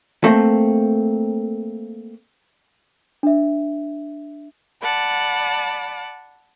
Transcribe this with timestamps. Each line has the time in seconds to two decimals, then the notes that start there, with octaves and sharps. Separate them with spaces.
0.24 A3 A#3 C4
3.23 D4 E5
4.82 D5 F#5 A5 B5